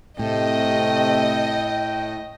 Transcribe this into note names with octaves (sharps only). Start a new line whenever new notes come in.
A2 C3 A3 D#5 G5